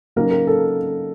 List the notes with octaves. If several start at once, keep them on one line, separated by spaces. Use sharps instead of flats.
C#3 F#3 A#3 D#4 A#4
A#4
A4